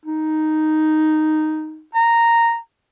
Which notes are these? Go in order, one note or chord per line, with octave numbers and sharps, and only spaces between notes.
D#4
A#5